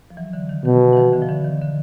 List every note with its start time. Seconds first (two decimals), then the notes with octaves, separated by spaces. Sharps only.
0.10 F3
0.17 E3 F#3
0.33 D3 E3
0.49 D#3
0.65 B2 D#3
0.81 D#3
0.93 E3
0.97 D#3 F3
1.13 D3 E3
1.22 F3
1.29 D3 E3
1.44 D#3
1.61 D3